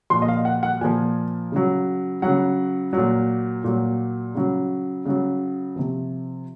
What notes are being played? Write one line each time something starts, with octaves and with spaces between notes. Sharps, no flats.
A#2 F3 C6
D#5
F5
F#5
F#5
A#2 F3 G#5
C#3 F#3
C#3 F#3 F#5
A#2 F#3
A#2 F#3
C#3 F#3
C#3 F#3
C3 F3